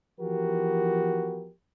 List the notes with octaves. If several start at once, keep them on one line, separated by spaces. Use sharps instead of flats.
E3 F3 B3 F#4 G4 A#4